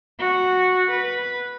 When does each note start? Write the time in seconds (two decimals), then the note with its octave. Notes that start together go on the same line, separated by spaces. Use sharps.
0.19 F#4
0.91 B4